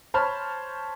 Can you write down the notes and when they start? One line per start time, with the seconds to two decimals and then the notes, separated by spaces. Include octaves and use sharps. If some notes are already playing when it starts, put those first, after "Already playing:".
0.14 C5 C#5 A5 B5 F6